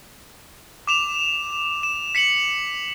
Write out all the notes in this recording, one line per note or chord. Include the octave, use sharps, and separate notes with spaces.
D6 E7 F7
E7
B6 C#7 E7 F#7